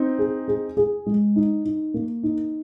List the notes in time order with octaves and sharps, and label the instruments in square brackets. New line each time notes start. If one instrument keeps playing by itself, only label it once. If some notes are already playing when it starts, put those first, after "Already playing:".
Already playing: [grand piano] C4 D#4
[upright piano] G#4
G#4
G#4
G#3
D#4
D#4
A#3
D#4